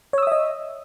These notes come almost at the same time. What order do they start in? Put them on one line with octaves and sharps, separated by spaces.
C#5 E6 D#6 E5 D#5